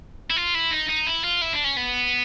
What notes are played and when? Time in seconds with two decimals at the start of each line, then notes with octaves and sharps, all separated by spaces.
0.30 E4
0.36 F4
0.55 E4
0.71 D#4
0.89 D#4
1.07 E4
1.24 F4
1.42 E4
1.53 D4
1.64 C#4
1.77 B3